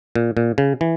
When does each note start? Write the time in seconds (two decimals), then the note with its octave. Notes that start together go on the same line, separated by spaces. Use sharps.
0.16 A#2
0.37 A#2
0.58 C#3
0.81 E3